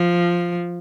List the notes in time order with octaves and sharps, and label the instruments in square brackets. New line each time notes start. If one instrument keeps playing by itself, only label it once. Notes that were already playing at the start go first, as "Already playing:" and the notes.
Already playing: [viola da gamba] F3